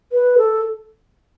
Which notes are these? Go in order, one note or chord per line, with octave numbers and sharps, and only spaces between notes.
B4
A4